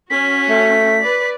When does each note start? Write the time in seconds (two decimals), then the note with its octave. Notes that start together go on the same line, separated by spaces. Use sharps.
0.10 C#4 F#4 B6
0.49 A3
1.01 B4 D5